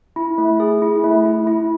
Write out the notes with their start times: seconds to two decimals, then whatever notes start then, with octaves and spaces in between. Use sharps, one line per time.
0.16 E4
0.38 A3
0.60 G#4
0.82 E4
1.04 A3
1.25 E4
1.47 E4